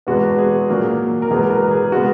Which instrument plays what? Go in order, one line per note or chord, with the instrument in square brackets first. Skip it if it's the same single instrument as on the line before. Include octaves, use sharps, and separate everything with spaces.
[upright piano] E2 B2 G#3 B3 F#4
G#4
A#2 F#3 A#3
A#4
E2 B2 G#3 B3 G#4
A#4
G#4
C#3 G#3 B3 F#4